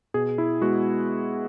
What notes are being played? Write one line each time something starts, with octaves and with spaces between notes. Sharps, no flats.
B2 G#4
E4
G#3 B3 F#4